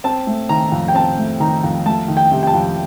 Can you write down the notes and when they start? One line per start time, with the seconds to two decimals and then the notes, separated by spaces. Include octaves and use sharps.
0.04 C4 A5
0.27 A3
0.49 D#3 A#5
0.72 F2
0.88 G5
0.95 C4 A5
1.18 A3
1.40 D#3 A#5
1.63 F2
1.86 A3 A5
2.08 D#3
2.17 G5
2.32 C3
2.43 G5
2.47 A5
2.54 F2